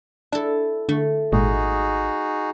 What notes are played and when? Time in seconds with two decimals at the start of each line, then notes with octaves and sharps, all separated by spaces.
0.32 D4 E4 A4
0.89 D3 A3
1.32 G#1 A#2 G#3 D#4 F#4 G#4